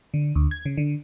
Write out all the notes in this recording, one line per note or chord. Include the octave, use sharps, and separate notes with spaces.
D3
D2
G#6
C#3
D3